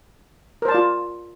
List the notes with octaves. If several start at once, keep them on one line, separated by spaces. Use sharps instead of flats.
F4 A#4 C5 D5 A5